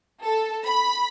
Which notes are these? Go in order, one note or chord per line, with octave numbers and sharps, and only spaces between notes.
A4
B5